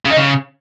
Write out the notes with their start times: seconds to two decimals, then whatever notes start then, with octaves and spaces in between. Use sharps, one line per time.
0.05 C#3
0.11 D#4
0.16 C#3